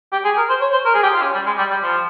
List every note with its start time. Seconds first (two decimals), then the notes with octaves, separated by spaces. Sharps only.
0.12 G4
0.25 G#4
0.37 A#4
0.49 C5
0.61 C#5
0.73 C5
0.85 A#4
0.94 G#4
1.03 G4
1.13 F4
1.22 C#4
1.34 G3
1.46 G#3
1.58 G3
1.71 G3
1.83 F3